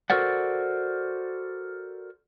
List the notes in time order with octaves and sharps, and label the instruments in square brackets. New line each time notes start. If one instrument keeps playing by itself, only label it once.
[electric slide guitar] F#4 A4 A#4 C5 D5 F#5